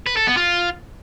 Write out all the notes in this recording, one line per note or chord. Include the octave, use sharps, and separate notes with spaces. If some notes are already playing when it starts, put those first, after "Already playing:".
B4
A4
B3
F4